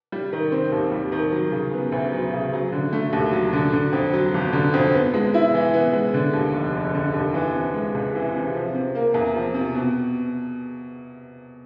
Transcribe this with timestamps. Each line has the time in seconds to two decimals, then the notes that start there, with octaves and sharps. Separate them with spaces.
0.12 G3
0.32 D#3
0.52 C4
0.72 D#2
0.92 G3
1.12 D#3
1.32 F#3
1.52 C#3
1.73 B3
1.92 D2
2.12 F#3
2.33 C#3
2.53 F#3
2.72 D3
2.93 A3
3.13 D#2
3.32 F#3
3.53 D3
3.73 D3
3.92 F2
4.13 F#3
4.34 G1
4.53 D3
4.74 F2
4.93 B3
5.14 G#3
5.34 E4
5.54 E3
5.74 B3
5.93 G#3
6.14 D3
6.33 D#2
6.53 F1
6.74 F1
6.95 D3
7.14 D#2
7.34 E3
7.54 C3
7.74 G#3
7.94 C#2
8.15 E3
8.34 C3
8.55 F3
8.74 C3
8.95 A#3
9.14 E2
9.35 F3
9.54 C3
9.75 B2